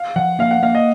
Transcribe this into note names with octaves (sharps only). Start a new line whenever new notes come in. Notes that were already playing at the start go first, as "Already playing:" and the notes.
Already playing: F5
F3 F#5
A#3 F5
F#5
A#3 F5
D#5